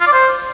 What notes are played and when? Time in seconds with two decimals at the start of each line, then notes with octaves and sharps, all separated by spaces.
0.01 F4
0.07 D5
0.13 C5